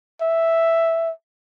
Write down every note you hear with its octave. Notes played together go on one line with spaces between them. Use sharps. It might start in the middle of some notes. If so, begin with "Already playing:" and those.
E5